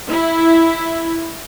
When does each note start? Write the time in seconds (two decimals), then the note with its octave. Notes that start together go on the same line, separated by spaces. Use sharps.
0.10 E4